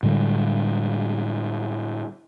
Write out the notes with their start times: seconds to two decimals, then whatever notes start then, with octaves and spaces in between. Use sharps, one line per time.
0.03 A2 D3 G3 G#3